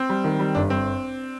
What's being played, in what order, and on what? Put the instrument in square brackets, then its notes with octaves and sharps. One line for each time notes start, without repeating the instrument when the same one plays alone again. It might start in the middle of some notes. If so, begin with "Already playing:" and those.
Already playing: [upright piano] C4
[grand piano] G3
D#3
G3
[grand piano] G1 [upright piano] D4
[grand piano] G1 [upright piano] C4